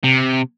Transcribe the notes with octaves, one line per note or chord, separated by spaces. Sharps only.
C3